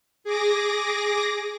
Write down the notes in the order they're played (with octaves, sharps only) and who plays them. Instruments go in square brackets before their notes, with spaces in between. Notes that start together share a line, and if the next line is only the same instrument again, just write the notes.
[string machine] G#4 D6 A#6